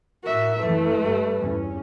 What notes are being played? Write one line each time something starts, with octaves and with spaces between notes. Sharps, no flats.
A2 F#4 A#4 E5
F#2 E3 A3 B4
G2 G3
G1 E2 C#4